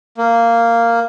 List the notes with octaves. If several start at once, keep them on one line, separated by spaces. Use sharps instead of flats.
A#3